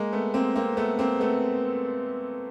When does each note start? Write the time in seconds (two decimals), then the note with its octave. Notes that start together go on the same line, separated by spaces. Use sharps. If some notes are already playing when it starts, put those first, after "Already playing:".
Already playing: G#3 A#3
0.12 A3 B3
0.34 A#3 C4
0.56 A#3 C4
0.77 A3 B3
0.99 A#3 C4
1.20 A3 B3